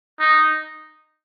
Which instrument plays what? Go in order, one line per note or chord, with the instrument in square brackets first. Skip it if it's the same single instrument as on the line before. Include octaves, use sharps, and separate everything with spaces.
[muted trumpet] D#4